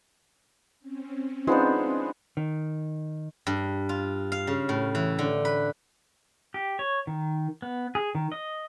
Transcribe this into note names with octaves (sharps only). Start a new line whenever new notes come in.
C4 C#4
G#3 B3 D4 D#4 F4 C5
D#3
G2
F4
F5
C#3
A2
E3
D3
B4
G4
C#5
D#3
B3
G#4
D#3
D#5